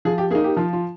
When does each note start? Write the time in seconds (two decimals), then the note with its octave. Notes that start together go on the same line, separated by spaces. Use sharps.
0.05 F3 G#4
0.18 G4
0.31 A#3 G#4
0.35 D#4
0.44 G4
0.57 F3 F4
0.73 F4